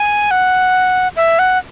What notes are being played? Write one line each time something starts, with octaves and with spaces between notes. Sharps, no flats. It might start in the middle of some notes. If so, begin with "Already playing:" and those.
Already playing: G#5
F#5
E5
F#5